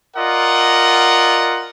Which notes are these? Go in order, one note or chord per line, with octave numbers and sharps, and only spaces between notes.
F4 A#4 D5 D#5 F#5